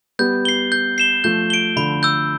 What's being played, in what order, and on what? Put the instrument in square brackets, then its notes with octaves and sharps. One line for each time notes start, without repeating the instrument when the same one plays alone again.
[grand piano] G3 B3 [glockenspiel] G6
[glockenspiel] C7 G7
G6
C7 E7 G7
[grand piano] F3 A3 [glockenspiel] G6
[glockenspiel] D7 G7
[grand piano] D3 F3 [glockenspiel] B5
[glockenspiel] E6 G6